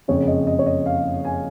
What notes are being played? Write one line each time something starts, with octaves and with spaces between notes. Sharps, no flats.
F#1 F2 C#3 C#5
D#5
D#5
C#5
D#5
F5
G#5